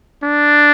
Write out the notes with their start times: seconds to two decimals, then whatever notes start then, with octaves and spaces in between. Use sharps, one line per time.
0.23 D4